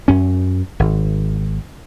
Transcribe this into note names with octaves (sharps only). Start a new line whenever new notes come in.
F#2 C#4
G#1